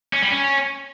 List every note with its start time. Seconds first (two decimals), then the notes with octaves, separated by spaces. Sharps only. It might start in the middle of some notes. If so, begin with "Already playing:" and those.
0.13 C#4
0.22 G3
0.31 C#4